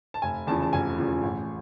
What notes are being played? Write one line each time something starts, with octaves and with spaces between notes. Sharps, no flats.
A5
F1 G#5
E2 C#3 F3 A5
A5
F1 G#5
E2 C#3 F3
A1